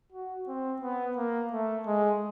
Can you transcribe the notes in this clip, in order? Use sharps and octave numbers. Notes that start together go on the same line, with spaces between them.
F#4
C4
B3
A#3
A3
G#3